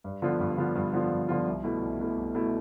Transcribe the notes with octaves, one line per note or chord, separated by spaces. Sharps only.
G2
D3 F3 B3 F4
G2
D3 F3 B3 F4
G2
D3 F3 B3 F4
G2
D3 F3 B3 F4
C2
B2 A3 E4
C2
B2 A3 E4
C2
B2 A3 E4